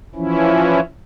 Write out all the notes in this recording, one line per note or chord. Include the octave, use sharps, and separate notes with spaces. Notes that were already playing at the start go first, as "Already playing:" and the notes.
E3 F3 C#4 E4